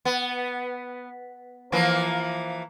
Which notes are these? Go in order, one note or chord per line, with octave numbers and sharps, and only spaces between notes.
B3
E3 F3 A#3